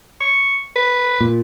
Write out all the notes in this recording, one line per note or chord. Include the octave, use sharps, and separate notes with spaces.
C#6
B4
A#2